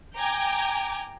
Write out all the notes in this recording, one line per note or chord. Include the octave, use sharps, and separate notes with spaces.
G5 G#5 A#5 D6 G6